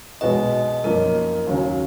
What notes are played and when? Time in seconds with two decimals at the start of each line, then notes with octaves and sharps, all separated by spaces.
0.21 B1 B2 G#3 B3 F#4 D#5
0.53 D#5
0.84 F#2 F3 A#3 D#4 A#4
1.47 D#2 C#3 F#3 C#4